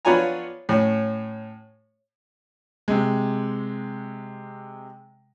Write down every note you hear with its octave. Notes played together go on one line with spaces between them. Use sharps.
B3 D4 F4 C#5 G#5 A#5
A2 C#4
C3 G#3